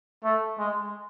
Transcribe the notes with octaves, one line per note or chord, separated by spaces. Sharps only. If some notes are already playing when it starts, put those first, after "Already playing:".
A3
G#3